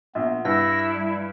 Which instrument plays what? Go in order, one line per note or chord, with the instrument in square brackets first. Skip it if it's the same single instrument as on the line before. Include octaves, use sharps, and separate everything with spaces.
[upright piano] A#1 [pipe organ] B3
[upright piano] G2 [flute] E4 [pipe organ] E6 A#6
[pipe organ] G3